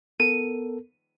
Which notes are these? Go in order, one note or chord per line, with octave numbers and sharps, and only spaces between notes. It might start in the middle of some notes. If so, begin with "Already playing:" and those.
B3 A4 A#4 D#7